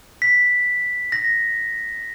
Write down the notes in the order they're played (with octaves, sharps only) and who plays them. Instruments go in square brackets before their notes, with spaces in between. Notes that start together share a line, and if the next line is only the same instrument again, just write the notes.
[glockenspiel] B6
A#6